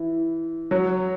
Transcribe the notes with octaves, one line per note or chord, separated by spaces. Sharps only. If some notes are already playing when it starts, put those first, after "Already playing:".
Already playing: E3
F#3